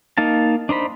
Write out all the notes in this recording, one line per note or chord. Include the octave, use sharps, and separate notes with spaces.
A#3 D#4 F5 A5
D4 D#4 C5 B5